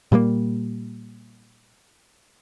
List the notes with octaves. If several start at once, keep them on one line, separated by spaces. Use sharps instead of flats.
A#2 G3 G#3 A#3